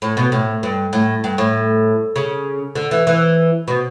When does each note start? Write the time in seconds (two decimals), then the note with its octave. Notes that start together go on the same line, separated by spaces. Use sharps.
0.02 A2
0.17 B2
0.32 A2
0.63 G2
0.93 A2
1.24 G2
1.38 A2
2.16 C#3
2.75 D3
2.91 E3
3.07 E3
3.68 B2